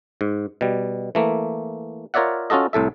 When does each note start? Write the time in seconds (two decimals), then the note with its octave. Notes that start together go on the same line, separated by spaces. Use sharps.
0.21 G#2
0.61 B2 G3
1.15 E3 A3 A#3
2.14 F4 A#4 C#5 D5 E5 F#5
2.50 C#4 F4 F#4 A4 D#5
2.73 C2 A2 A4 E5